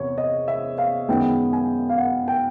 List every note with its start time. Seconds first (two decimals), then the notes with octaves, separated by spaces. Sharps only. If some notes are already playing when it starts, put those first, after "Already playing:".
Already playing: E2 C3 C#5
0.18 D#5
0.48 E5
0.78 F5
1.08 F#2 D#3 G#3 B3 G5
1.53 G#5
1.90 F5
1.98 F#5
2.28 G5